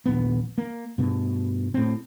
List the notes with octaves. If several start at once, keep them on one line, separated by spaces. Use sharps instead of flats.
D#1 A#1 B3
A#3
G2 B2
A2 C4